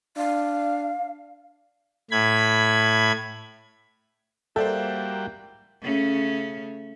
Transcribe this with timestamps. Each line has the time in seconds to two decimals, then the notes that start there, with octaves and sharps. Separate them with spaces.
0.17 D4 F5
2.11 A2 B5 G#6
4.56 G3 A#3 F#4 A4 C5 D5 E5 G5
5.81 C#3 A3 C#4